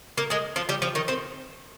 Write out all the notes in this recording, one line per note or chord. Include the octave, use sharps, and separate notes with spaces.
A#3 A#4
G#3 G#4
F3 F4
G3 G4
F3 F4
D#3 D#4
C4 C5